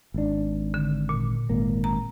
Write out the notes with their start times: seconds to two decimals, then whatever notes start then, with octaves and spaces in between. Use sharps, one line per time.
0.14 G#1 D4
0.74 D3
1.09 A#2
1.49 G#1 A#3
1.84 A#5